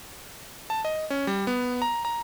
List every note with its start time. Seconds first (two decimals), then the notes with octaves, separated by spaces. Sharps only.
0.70 A5
0.85 D#5
1.10 C#4
1.27 G3
1.47 B3
1.82 A#5
2.05 A#5